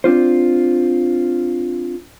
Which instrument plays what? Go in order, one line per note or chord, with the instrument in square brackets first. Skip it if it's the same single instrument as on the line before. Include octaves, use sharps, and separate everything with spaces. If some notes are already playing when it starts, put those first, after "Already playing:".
[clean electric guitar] C4 D4 F4 C5